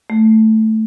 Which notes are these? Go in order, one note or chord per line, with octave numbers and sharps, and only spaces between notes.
A3